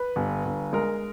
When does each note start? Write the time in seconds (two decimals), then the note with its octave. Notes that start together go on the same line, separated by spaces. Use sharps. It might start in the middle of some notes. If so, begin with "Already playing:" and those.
Already playing: B4
0.16 G1
0.45 G1
0.73 G#3 A#4